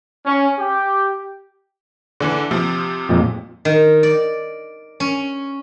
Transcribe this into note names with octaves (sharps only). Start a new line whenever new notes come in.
C#4
G4
D3 E3
C3 F3
F2 A#2 G#3
D#3
D5
C#4